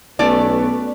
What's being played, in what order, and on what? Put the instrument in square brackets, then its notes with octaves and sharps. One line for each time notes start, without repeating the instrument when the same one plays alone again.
[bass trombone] B1 [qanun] A3 C#4 A4 [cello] B3 [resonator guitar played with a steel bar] D5